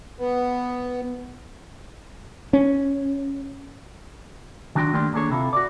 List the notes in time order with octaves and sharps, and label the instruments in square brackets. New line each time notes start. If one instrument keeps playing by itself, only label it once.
[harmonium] B3
[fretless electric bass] C#4
[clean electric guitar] D#3 F#3 D4 F#4 G5 C6
D#3 A3 A#3 D4 G4 C6
D#3 A#3 D4 G#4 A4 C#5
C3 E4 F4 A4
F#4 D5